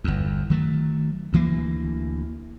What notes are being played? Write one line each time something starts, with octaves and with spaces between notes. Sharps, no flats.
G1 E2
D#3 F#3 A3
D2 E3 A#3